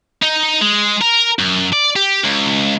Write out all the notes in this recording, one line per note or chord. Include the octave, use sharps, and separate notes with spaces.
D#4
G#3
A#4
F#2
D5
G4
C#2